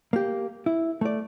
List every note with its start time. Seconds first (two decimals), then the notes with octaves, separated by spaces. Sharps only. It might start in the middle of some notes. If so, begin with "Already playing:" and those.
0.13 A#3 G4
0.66 E4
1.01 A3 D5